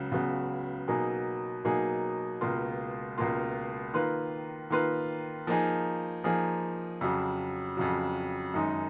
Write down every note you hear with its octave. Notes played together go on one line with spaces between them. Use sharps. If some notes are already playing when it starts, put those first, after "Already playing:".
Already playing: C#2 C#3 F#3
C#2 C#3 F#3 B3
B2 F#3 A#3 D#4 G#4
B2 F#3 A#3 D#4 G#4
C#2 B2 A#3 F4
C#2 B2 A#3 F4
D#3 A#3 F4 B4
D#3 A#3 F4 B4
F3 A#3 D#4 G#4
F3 A#3 D#4 G#4
F2 C#3 F#3
F2 C#3 F#3
F#2 D#3 G#3 D#4